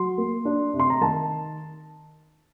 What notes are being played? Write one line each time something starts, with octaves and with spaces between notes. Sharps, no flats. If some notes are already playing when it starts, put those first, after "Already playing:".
Already playing: F#3 C6
A#3
D4
C3
C6
A#5
D#3 A5